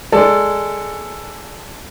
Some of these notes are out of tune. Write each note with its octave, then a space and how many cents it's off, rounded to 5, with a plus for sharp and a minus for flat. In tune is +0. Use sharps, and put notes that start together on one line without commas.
G#3 +0 A4 +10 D5 -10